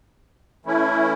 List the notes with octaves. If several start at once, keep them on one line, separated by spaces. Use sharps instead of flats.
E3 A3 C#4 E4